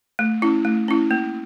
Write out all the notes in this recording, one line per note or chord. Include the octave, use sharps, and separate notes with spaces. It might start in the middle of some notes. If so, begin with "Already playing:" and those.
A3
C#4 E4
A3
C#4 E4
A#3